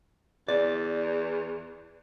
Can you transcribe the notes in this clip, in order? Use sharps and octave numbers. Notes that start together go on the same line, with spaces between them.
E2 D5